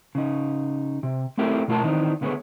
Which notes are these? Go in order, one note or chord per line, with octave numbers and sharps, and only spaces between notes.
C#3 D#4
C3
A3 C4 E4 G4 A4 A#4
B2 A3 F4 A#4 A5
D#3 E3 C4 D4 D#4
C#2 D3 B3 F#4 G#4 C#5